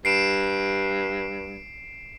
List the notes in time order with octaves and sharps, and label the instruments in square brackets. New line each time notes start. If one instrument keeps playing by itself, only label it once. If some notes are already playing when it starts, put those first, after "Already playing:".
[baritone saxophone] G2 [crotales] C7 D7 E7